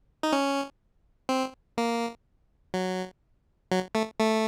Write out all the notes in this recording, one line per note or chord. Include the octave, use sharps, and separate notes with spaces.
D#4
C#4
C4
A#3
F#3
F#3
A3
A3